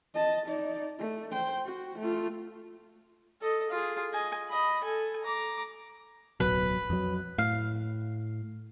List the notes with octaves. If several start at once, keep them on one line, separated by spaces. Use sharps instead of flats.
D#5 A5
D#4 D5
A3
C5 G5
F#4
A3 F4
A4 D#5
F4 G#4
D#5 G#5
D#5 B5
A4 G#5
A#5 D6
D1 B1 F#3 B4
F2 F#3
A2 F5